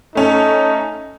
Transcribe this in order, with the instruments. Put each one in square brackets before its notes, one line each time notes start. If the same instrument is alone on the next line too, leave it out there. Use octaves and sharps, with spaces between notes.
[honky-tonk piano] A3 C#4 A4 [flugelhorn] D#4